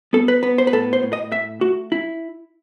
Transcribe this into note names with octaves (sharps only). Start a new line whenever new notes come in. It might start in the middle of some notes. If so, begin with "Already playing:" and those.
B3 A4
B4
B3 B4
C5
B4
A2 A4
C5
A2
D#5
A3 E5
A3 F#4
E4